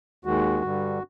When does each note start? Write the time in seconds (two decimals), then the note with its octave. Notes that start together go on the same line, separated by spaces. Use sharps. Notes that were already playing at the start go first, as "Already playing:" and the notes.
0.25 D#2 D#3 G#3 F#4
0.62 G2 D3 G3